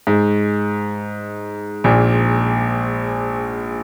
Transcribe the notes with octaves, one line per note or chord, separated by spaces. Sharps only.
G#2
A#1 A#2